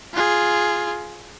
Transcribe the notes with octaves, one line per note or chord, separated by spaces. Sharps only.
F4 G#4